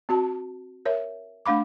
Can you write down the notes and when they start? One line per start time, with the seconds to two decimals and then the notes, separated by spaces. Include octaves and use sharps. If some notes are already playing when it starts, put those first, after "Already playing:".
0.09 C4 F#4 A5
0.85 A#4 C#5 E5
1.46 A3 D4 F5 B5 D6